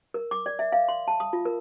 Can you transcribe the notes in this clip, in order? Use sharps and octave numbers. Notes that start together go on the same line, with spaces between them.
A#4
D6
D5
E5
F5
C6
A5
D#6
F4
A#4